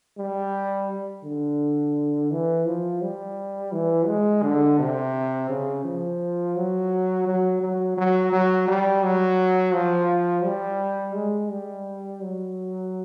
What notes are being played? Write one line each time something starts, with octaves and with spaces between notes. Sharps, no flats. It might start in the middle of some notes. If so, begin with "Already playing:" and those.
G3
D3
E3
F3
G3
E3
G#3
D3
C3
C#3
F3
F#3
F#3
F#3
F#3
F#3
G3
F#3
F3
G3
G#3
G3
F#3